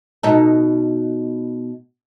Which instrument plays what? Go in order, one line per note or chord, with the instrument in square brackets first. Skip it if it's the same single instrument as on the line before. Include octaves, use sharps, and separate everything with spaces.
[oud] B2 D#4 A4